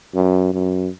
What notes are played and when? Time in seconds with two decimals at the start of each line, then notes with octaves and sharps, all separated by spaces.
0.15 F#2
0.54 F#2